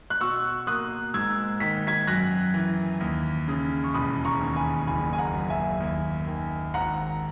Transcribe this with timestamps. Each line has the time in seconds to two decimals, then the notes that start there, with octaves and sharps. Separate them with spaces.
0.10 F#6
0.21 B2 C#6 E6
0.67 A#3 D#6 F#6
1.14 G#2 E6 G#6
1.60 D#3 B6
1.87 G#6 B6
2.07 F#2 F#6 A#6
2.54 E3
3.00 D#2
3.48 C#3
3.84 C#6
3.94 E1 B5 D#6
4.25 A#5 C#6
4.41 D#2
4.56 G#5 B5
4.87 F#1 G#5 B5
5.13 G#5
5.18 F#5 A#5
5.34 F#2
5.50 E5 G#5
5.80 D#2
6.27 D#3
6.74 G#1 F#5 A#5